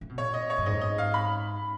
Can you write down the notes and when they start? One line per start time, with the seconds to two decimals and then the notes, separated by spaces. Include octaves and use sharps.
0.01 C#3
0.09 B2
0.18 A#2 C#5
0.34 D#5
0.50 C#5
0.58 F#2
0.66 G#2 D#5
0.81 D#5
0.98 F5
1.14 B5